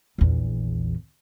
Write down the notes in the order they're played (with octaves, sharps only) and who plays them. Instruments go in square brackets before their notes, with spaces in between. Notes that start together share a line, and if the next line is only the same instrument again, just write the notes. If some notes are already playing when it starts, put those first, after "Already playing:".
[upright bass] A#1 E2